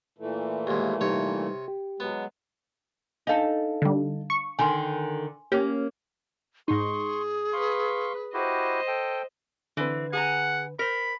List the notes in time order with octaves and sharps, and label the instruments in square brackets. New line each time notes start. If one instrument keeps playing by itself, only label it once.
[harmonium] A#2 E3 A3
[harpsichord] D#2 G#2
[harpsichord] C3 C#5 [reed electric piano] G3 D#4 B4
[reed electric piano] G4
[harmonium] F#3 G#3 [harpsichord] B3
[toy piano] D4 F5 A5 [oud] D#4 A4
[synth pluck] D3 G3
C#6
[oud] D3 D#3 [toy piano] G#5 C6
[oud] A#3 C#4 [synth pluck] G4
[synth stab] G#2 D#4 [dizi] G#4 [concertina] C6 C#6
[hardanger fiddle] B4 [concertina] F5 C6 C#6
[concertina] E4 F#4 G4 [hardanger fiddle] C5 D#5
[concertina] A4 G5
[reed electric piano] D3 B4 [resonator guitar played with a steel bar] E3 C4
[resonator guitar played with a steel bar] G#4 G#5 A#5 [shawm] F#5
[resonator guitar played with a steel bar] A#4 C5 [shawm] B5